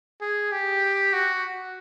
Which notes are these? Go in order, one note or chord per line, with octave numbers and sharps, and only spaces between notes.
G#4
G4
F#4